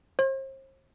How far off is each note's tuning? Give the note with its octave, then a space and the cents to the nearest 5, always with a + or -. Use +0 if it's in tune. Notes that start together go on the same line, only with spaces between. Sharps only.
C5 +40